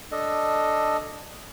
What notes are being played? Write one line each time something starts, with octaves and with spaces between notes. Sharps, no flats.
D4 A4 D#5